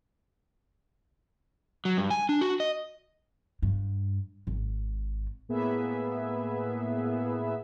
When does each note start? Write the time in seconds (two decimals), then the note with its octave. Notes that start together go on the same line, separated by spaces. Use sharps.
1.85 F#3
1.98 G2
2.10 G#5
2.29 D4
2.41 F#4
2.60 D#5
3.62 G2
4.47 G#1
5.49 A2 A#3 B3 G#4 B4 E5